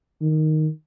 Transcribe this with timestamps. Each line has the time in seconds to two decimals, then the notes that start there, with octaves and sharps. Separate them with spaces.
0.21 D#3